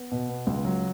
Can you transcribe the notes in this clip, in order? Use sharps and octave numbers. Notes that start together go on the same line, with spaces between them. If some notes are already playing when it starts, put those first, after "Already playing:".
Already playing: B3
B2
B3
C#2
F#3